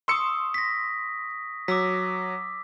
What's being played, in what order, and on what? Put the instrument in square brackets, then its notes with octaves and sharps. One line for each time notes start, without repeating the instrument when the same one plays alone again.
[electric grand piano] C6 E6 C#7 [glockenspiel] C#6 D#6
[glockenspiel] A#6 B6
[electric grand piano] F#3 [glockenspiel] D6 E6 B6